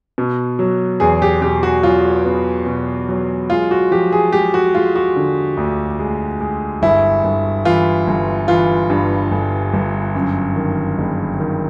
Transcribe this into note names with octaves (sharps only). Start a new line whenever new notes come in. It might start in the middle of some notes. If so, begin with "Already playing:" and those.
B2
F#3
E2 G#4
G4
B2 G4
F#4
F#3 F4
B3
B2
F#3
G#3 F4
F#4
F3 G4
G#4
G#3 G4
F#4
G#3 F4
F#4
D3
D2
G#3
G#3
G1 E4
G1
E3 F4
G1
E3 F4
G2
G1
G1
F#2
D#3
F#1
D#3